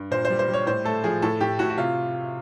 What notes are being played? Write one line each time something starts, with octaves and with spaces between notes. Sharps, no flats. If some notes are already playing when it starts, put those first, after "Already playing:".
Already playing: G2
A#2 C5
C5
G3
C5
G3
C#5
A2 C5
A3 A4
F3 G#4
A2 A4
A2 G4
A2 F#4
F#4
C3 F4